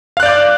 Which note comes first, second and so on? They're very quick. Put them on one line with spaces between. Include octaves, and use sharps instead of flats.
F5 F#6 D5 G6 D6